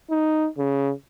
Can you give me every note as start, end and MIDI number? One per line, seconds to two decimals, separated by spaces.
0.10 0.48 63
0.58 0.92 49